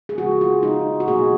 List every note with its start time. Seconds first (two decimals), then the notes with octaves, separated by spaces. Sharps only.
0.09 G#4
0.18 C#3 F3 G#3 F#4
0.41 F4
0.63 D#4
1.00 F#4
1.08 B2 F#3 A#3 G#4